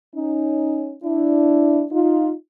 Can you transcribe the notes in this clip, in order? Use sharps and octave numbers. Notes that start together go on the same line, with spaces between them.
C#4 D#4
D4 E4
D#4 F4